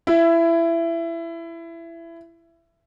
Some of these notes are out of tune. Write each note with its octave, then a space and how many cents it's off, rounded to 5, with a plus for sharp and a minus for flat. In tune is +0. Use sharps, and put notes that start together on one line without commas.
E4 +20